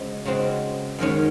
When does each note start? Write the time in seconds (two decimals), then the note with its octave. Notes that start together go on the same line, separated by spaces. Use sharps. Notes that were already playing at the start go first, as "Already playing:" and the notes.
Already playing: C#3 G#3 C4 F#4
0.25 C#3 G#3 C4 F#4
0.98 F#2 D#3 G#3 C#4